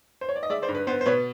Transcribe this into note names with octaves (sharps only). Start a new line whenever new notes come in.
C5
C#5
D5
D#5
G#3 D5 E5
C5 D5
G2
B4
B3 C5
C5
B2 B4 C#5